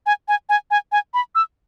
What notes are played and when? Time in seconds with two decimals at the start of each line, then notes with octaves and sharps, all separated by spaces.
0.06 G#5
0.28 G#5
0.49 G#5
0.71 G#5
0.92 G#5
1.14 B5
1.35 E6